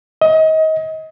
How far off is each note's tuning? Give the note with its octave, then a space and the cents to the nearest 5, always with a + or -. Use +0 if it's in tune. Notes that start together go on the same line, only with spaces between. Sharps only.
D#5 +30